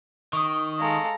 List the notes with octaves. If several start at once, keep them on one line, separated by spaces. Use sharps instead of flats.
D#3 C#6 D#6
G#3 A4 F5 A#5